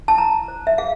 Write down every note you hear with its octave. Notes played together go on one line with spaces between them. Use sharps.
A5
E4 A#5
C5
E5
G#4 F5